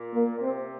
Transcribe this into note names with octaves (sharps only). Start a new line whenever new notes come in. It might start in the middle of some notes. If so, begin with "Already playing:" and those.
Already playing: A#2
A#3
A#2
C3 C4